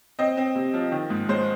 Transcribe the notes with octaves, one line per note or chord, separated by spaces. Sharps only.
C4 D#5
C4
C3
F3
D#3
G#2
G#3 C5